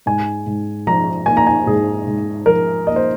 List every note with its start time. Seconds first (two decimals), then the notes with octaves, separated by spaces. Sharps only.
0.06 G#2 G#5
0.46 G#2
0.87 F3 A#5
1.26 A#3 G#5
1.37 A#5
1.47 G#5
1.67 G#2 G#4
2.07 G#2
2.46 F3 A#4
2.87 A#3 D#5
2.96 C5